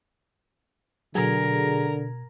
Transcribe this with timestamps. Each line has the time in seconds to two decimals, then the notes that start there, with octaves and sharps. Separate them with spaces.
1.15 B2 D3 F#3 G#4 A#4 G#6 A#6